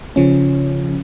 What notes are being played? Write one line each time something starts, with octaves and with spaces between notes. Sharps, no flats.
C#3 F3 C#4